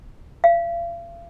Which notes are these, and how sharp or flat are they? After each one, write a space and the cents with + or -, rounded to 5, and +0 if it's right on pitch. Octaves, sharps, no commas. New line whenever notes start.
F5 -40